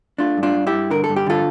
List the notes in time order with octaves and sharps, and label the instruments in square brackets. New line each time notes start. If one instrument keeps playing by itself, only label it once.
[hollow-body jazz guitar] A3 D4 F4
G2
D4 F4
G2
E4 G4
G2
D3 A#4
A4
G2
G4
D3 F4 A4